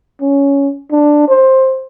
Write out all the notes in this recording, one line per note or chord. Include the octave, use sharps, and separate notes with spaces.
C#4
D4
C5